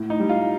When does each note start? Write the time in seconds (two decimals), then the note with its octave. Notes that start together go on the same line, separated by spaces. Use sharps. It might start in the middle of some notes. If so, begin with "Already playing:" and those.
Already playing: A2
0.10 D#4
0.20 G3
0.29 F4